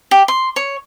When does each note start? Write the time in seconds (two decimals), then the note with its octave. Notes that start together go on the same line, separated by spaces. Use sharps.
0.11 G4
0.28 C6
0.56 C#5